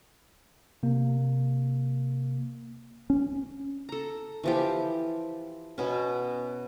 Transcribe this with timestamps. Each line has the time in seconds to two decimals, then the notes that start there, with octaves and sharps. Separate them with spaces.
0.83 C3 A#3
3.10 C#4
3.89 A4 A#5
4.43 E3 F3 G4
5.78 B2 B3 C#4